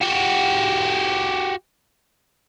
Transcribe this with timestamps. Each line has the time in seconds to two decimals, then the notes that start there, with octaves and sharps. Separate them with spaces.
0.02 F#4 G4